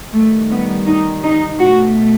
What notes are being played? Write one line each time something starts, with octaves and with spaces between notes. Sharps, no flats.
D#3 G3 A3
B3
D#4
D#4
B2 A3 F#4